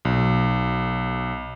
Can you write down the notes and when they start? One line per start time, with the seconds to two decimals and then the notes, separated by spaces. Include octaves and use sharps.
0.05 B1